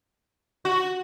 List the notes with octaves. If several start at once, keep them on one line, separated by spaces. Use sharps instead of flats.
F#4